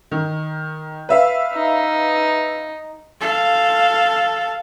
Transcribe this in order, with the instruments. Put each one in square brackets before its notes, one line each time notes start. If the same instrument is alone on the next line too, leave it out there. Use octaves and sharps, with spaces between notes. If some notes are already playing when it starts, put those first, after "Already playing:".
[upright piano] D#3
B4 E5 F5
[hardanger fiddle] D#4
[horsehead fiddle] A4 F5